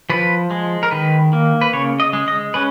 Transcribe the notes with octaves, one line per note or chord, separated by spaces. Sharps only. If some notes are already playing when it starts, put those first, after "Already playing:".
F3 B4
G#3
A#4
D#3 B4
A#3
B4
C#3 C#5
D#5
G#3
D#5
C#4 B4